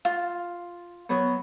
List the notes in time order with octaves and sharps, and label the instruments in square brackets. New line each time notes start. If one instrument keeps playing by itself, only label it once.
[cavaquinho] F4
[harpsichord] F#3 B3